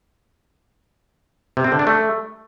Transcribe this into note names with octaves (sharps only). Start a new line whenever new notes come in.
C3
C4
D3
D4
A3